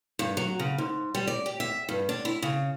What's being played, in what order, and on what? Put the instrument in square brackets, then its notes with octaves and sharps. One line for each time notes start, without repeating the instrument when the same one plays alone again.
[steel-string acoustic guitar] G2
F#3
C#3
G#2
G3
D5
G4
E5
G2
D4
E4
C#3